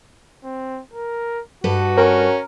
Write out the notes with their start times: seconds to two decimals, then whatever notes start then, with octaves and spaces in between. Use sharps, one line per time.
0.44 C4
0.94 A#4
1.64 G2 F#4 A4 B4
1.98 C#4 A#4